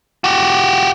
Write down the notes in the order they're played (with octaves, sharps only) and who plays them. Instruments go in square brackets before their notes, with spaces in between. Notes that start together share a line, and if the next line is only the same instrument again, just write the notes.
[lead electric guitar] F#4 G4